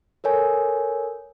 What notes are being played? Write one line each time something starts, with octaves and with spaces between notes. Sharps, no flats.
A4 A#4 C#5 G#5